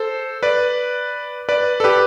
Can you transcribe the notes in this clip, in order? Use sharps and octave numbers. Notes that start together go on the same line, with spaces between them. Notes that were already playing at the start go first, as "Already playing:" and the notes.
Already playing: A4 C5
B4 D5
B4 D5
A4
G4 B4